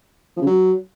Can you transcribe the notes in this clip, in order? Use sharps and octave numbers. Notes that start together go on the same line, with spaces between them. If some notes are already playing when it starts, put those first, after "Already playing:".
F3
C#3
F#3